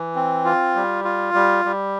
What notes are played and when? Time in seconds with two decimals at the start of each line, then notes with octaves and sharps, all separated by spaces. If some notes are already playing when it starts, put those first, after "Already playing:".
Already playing: E3
0.16 C4
0.45 F4
0.75 G3
1.04 F4
1.34 G3
1.65 G3